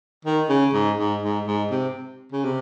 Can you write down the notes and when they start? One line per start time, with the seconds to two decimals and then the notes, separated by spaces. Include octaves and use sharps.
0.25 D#3
0.49 C#3
0.73 G#2
0.97 G#2
1.22 G#2
1.47 G#2
1.71 C3
2.32 C#3
2.44 C3